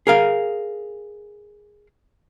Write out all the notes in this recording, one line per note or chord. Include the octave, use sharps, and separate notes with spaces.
G#4 A#4 F5